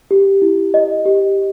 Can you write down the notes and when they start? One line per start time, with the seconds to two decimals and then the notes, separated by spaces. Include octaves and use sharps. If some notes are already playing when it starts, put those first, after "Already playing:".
0.11 G4
0.42 E4
0.74 D#5
1.06 G4